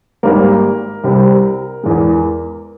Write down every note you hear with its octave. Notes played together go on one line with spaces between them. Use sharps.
G#1 G#2 G3 A#3 A#4
C2 C3 G3
E2 E3 G#3